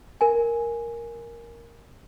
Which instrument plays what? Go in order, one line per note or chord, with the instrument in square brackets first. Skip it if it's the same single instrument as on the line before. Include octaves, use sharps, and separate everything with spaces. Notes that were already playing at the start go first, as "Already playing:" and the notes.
[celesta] A#4 G#5